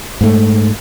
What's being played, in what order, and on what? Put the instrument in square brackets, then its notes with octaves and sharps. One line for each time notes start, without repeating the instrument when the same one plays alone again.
[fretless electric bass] G#2 A3